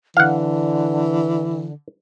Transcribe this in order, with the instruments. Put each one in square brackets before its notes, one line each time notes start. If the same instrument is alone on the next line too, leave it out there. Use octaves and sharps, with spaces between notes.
[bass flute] D3 [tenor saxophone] E3 [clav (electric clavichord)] F5 F#5